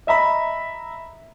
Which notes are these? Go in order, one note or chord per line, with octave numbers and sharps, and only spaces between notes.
D#5 E5 A#5 B5